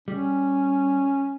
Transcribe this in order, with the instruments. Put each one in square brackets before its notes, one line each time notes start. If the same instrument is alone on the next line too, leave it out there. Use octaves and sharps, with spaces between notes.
[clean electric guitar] G3 [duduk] C#4